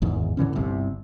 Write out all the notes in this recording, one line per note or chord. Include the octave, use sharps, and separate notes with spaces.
D1 G#1 E2 G#2
A2 D3 E3 C#4
G1 C2 C3